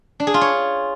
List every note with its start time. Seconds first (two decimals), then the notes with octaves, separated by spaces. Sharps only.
0.20 D4
0.27 G#4
0.34 F4
0.41 C#5